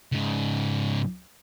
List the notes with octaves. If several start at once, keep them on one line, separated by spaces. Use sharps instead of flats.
G#2 C#3